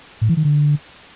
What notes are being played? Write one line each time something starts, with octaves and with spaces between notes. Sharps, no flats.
A2
E3
D#3
D3